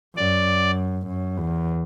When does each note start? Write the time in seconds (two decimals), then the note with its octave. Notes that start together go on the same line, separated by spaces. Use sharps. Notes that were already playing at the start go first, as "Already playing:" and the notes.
0.16 F#2 D5
1.07 F#2
1.38 E2